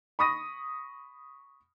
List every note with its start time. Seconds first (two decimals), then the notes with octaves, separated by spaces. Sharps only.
0.19 B5 C#6 D#6 A#6 D#7